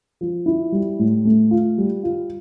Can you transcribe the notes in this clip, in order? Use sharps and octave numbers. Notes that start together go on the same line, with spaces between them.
F3
E4
G3
A2
A3
F4
G3
F4